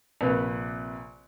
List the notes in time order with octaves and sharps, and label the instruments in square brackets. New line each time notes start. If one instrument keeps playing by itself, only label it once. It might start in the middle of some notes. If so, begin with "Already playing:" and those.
[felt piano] A#1 C3 B4